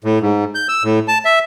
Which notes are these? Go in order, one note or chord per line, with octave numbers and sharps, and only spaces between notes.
A2
G#2
G6
E6
A2
A5
E5